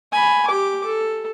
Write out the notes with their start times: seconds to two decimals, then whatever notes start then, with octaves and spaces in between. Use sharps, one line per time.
0.13 G#5 B5
0.47 G4 D6
0.85 A4